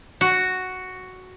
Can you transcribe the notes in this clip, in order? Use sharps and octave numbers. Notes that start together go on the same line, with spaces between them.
F#4